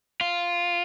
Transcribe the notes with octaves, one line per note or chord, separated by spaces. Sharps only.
F4